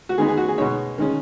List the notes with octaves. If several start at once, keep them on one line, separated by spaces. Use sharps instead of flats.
F#4
D#3 G#3 B3 D#4 G#4
G#4
F#4
G#4
B2 G#3 D#4 C#5
D#3 G#3 C#4